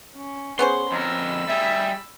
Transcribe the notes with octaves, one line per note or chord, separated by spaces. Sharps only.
C#4
B3 C#4 G#4 C5 C6 C#6
F2 A#4 B5 E6
G3 G#4 E5